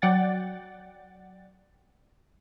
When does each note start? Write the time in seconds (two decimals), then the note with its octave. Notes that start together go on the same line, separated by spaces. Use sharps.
0.02 F#3 D5 F#5 G5 A6